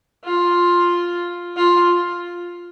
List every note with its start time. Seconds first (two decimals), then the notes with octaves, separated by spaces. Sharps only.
0.25 F4
1.56 F4